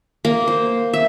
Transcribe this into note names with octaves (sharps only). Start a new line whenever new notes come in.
A#3
C5
E5